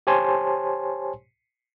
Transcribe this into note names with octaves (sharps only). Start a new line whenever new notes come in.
G4 C5 C#5 G#5 A5 C6